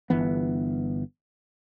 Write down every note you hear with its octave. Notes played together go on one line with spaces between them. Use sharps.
G1 E3 B3